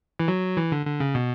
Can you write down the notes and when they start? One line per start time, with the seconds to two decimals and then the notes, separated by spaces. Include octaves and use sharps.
0.20 E3
0.28 F#3
0.57 E3
0.72 D3
0.86 D3
1.00 C#3
1.15 B2